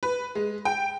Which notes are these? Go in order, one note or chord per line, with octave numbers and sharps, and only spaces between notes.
B4
G#3
G5